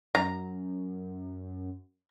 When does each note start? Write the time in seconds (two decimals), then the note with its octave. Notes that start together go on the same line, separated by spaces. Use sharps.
0.15 F#2 A#5